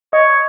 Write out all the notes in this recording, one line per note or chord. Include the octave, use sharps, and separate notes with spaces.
C#5 D#5